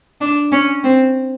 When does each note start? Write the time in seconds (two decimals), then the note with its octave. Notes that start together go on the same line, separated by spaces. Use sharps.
0.21 D4
0.52 C#4
0.83 C4